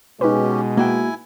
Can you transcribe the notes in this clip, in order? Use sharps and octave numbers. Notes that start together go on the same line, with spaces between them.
B2 G#3 C#4 D#4 G4 B4
A#3 E4 F#4 G5 G#5